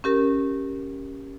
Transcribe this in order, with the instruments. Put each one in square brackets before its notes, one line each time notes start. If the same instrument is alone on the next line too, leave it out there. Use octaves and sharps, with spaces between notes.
[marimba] C#4 G4 A#4